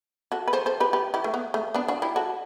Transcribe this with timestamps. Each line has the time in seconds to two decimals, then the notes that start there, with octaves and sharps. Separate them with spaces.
0.32 F#4 A4
0.48 B4
0.53 A4 C5
0.66 A4 C5
0.80 G4 B4
0.93 G4 B4
1.14 E4 G4
1.24 A3
1.34 B3
1.54 A3
1.74 B3 D4
1.88 D4 F#4
2.02 E4 G4
2.16 F#4 A4